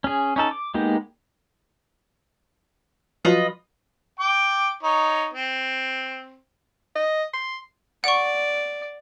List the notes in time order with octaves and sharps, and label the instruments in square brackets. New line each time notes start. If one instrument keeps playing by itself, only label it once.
[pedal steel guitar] C#4 G#4
C#4 D#4 A4
D6
G#3 A#3 B3 D#4 G4
[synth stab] F3 F#3 [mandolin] F4 B4 D#5
[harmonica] G5 D6
D#4 C#5
C4
[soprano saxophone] D#5
C6
[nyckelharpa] D5 [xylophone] F#5 C#6